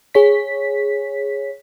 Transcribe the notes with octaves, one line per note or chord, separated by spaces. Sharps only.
G#4 C#5 B6